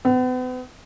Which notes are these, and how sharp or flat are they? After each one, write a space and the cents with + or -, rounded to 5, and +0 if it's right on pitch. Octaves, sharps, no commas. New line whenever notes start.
B3 +40